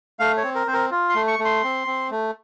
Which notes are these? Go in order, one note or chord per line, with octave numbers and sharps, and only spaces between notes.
A3 F5
C#5
C4
A#4
C4 C5
A#4
F4
C6
A3
C#6
A3
C6
C4
C4
A3